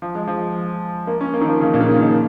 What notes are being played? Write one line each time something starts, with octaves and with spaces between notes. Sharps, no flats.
F3
G#3
F3
A#3
C#4
A#3
D#3
F3
C#3
A#2
D#3
C#3
D#3